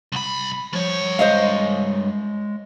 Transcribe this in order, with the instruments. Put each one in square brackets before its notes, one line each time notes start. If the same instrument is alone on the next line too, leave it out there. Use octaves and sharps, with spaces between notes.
[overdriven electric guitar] C2 B5
[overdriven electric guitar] G2 C#5 [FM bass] F3
[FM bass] G#3 [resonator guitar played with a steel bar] C5 D#5 F5